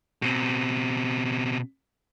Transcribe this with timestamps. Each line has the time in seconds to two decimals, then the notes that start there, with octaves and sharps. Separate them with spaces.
0.22 B2 C4